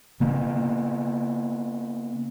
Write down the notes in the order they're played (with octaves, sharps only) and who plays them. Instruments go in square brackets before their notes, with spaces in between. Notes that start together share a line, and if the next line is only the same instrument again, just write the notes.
[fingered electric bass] C#3 A#3 B3